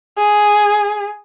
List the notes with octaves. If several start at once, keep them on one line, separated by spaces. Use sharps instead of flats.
G#4